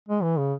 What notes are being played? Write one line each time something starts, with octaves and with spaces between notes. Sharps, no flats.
G#3
E3
C#3